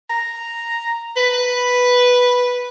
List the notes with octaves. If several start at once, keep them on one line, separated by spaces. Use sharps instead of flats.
A#5
B4